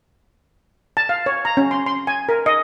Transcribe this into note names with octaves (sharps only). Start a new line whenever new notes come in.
A5
F5
C#5
A#5
C#4
C6
C6
G#5
A#4
D#5